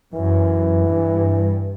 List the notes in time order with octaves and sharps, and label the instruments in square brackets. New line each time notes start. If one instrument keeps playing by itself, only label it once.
[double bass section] F#2 [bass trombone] E3
[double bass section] G2